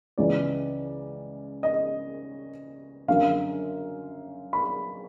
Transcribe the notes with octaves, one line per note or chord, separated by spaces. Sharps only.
C#2 C#3 E3 D5
D#5
F#2 D3 F5
B5